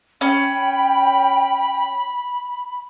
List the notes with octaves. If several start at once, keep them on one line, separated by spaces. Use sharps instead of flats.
C#4 G5 B5